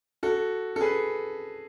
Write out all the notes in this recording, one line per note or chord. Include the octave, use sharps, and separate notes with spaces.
F#4 A4
A4
G#4 B4